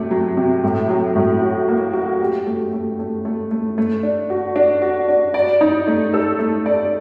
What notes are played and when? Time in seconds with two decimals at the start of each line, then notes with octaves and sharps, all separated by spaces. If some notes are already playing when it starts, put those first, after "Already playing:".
Already playing: C3 F#3 A3
0.11 F#3
0.37 C3
0.64 A2
0.89 F#3
1.15 A2
1.42 F#4
1.68 A#3
1.93 F#4
2.21 G4
2.46 A3
2.73 A3
2.99 A3
3.25 A3
3.51 A3
3.78 A3
4.03 D4
4.30 F#4
4.56 D4
4.82 F#4
5.09 D4
5.34 D5
5.61 D#4
5.87 A3
6.14 A4
6.39 A3
6.66 D5